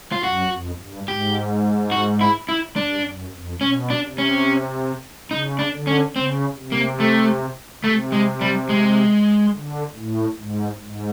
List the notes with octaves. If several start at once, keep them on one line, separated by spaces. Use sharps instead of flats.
F4
F#2 F#4
F2
G2
G#2 G4
F#4
E4
E4
G2 D4
F#2
F2
B2 C#4
D4
C3
C#4
C#3 D#4
D4
D3
C#4
C#3 C4
C3
A#3
A3
C3 A3
G#3
G3
G#3
D3
A2
G#2
G#2